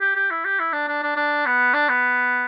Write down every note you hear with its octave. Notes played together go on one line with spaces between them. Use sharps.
G4
G4
E4
G4
E4
D4
D4
D4
D4
B3
D4
B3